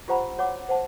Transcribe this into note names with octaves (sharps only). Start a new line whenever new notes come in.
F4 G4 C5 F#5 A#5 B5
F#4 C#5 F#5 D6
C5 F#5 A5